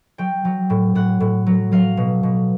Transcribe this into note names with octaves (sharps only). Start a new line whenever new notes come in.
F#3 G5
F#3
A2
A2 F#5
A2
F#3
F#3 F5
B2
B2